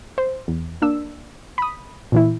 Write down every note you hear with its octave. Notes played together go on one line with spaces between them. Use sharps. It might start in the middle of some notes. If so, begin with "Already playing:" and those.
C5
E2
A#3 D4 E6
B5 D#6
A#2 E3 E4